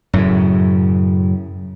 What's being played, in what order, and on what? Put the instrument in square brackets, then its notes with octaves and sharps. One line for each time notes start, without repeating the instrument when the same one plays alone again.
[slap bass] F#2 A2 C#3